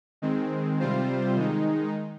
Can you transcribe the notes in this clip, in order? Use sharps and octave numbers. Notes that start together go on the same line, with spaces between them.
D#3 G#3 C4
C3 G3 C4 F4 C5
D#3 G#3 D#4